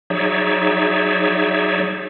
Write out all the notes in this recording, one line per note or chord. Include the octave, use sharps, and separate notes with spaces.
F#3 D#4 G#4 C#5 D5 E5